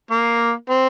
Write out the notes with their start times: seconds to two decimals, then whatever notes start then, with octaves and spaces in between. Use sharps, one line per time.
0.11 A#3
0.70 C4